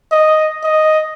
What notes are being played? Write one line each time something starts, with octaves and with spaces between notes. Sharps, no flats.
D#5
D#5